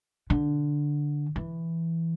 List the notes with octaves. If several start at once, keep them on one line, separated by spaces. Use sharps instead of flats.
D3
E3